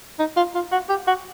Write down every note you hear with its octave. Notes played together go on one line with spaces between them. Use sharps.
D#4
F4
F4
F#4
G4
F#4